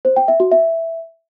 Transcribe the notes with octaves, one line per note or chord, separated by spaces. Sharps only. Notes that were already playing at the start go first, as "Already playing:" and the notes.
C5
G5
E5
F#4
E5